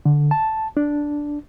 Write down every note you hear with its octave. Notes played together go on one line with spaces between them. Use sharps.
D3
A5
D4